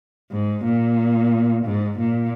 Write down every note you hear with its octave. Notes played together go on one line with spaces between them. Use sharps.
G#2
A#2
G#2
A#2